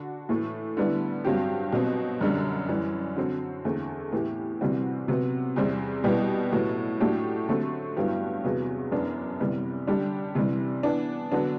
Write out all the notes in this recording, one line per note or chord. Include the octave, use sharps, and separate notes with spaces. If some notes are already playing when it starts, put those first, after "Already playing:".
Already playing: D3 D4 F#4
A2 E3 A3
D3 G3 B3 E4
G2 F#3 C4 G4
B2 F#3 C4
F#2 D3 G3
F#2 E3 G3
D3 F#3 C4
E2 D3 A3 C4
A2 E3 B3 E4 G4
C3 E3 G3 C4 F#4
C3 F#3 B3
E2 C3 G3 C4
B2 G3 B3 E4 G4
A2 F#3 B3
A2 F#3 A3 D4 G4
D3 F#3 A3 C4
G2 F#3 B3 E4 G4
E2 C3 F#3 B3
F#2 E3 B3 D4
C3 E3 G3 B3
D3 G3 D4 G4
C3 E3 G3
E3 B3 D4
D3 F#3 B3 D4